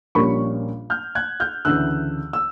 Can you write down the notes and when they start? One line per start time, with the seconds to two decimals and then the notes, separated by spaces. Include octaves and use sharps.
0.15 A#1 A#2 G3 A#3 C#4 B5 C#6
0.90 F6 G6
1.15 F#6 G#6
1.40 F6 G6
1.65 D2 C#3 E3 E6 F#6
2.33 E6